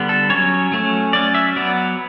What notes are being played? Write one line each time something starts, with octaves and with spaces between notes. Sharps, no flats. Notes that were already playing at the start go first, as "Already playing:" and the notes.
Already playing: D3 G3 B3
A4
F#3 C#4 C#5
F#3 A3 C#4
F#3 C#4 D5
E5
F#3 B3 D5